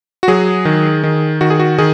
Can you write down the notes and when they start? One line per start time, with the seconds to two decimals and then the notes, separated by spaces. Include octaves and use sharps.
0.23 F#4
0.28 F#3 G#4
0.65 D#3
1.03 D#3
1.41 D#3 F#4
1.50 G#4
1.59 F#4
1.78 D#3 G#4